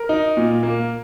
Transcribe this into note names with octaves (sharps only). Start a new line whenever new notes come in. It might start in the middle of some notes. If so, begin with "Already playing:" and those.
Already playing: A#4
D#4
A#2
A#3